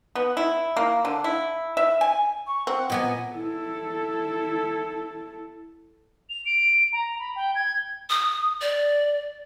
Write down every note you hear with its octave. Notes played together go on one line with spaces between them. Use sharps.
B3
E4
A#3
D3
E4
E5
G#5
C#6
C4 F#5
A#2 B3 D#5 G#5
E4 A4
F7
D7
A#5
B5
G5
G#6
D#6
D5